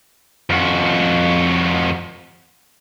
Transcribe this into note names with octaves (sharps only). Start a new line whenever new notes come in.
F2 F#4